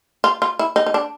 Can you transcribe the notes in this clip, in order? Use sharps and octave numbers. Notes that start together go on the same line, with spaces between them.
F4
F4
E4
D#4
D#4
D4